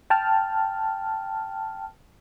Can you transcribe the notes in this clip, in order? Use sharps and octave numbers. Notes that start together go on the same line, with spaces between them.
G5 A5 F6